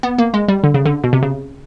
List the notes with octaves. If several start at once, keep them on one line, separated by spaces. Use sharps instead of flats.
B3
A#3
G#3
G3
D3
C#3
D3
B2
C3
C#3